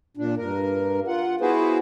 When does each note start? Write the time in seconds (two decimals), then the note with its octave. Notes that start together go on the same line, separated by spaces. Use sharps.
0.17 A#2 D4
0.37 G2 A#4
1.07 F4 F#5
1.41 B3 E4 F#4 G#4 B4 C5